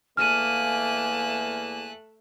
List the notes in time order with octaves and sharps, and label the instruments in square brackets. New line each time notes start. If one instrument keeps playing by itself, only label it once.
[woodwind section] E2 A#3 [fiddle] A3 F#6 [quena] G#5 [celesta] F6 D#7